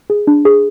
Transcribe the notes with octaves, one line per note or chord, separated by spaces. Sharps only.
G#4
D4
G#4